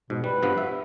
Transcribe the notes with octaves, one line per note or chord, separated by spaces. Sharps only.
G#2 B2
G3 B4
G2 F3 B3
E5